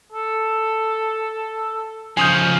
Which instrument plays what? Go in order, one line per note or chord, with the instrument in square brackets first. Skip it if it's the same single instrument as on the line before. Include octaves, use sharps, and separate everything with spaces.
[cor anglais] A4
[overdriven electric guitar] C#3 F3 [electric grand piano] G#5 D#6 G6